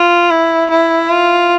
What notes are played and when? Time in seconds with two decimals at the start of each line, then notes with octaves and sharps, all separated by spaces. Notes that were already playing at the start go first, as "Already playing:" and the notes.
Already playing: F4
0.30 E4
0.70 E4
1.10 F4